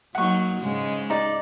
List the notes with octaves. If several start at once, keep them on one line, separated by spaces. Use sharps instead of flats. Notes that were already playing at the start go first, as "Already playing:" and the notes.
F#3 A#3 D#4 F#5 C#6
G#2 C#3 G#3
D#4 D5